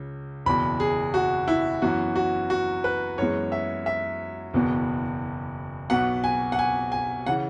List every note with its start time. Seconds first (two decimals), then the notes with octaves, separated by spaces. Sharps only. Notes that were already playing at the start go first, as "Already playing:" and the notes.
Already playing: C#2 C#3
0.46 F#1 E2 B2 B5
0.80 G#4
1.14 F#4
1.48 E4
1.82 F#2 E3 B3 F#4
2.16 F#4
2.50 F#4
2.84 B4
3.18 F#2 E3 G#3 B3 C#5
3.52 E5
3.86 E5
4.53 F#1 E2 B2 B3
5.90 B1 B2 B3 F#5
6.24 G#5
6.52 F#5
6.59 G#5
6.92 G#5
7.26 C#3 E3 F#5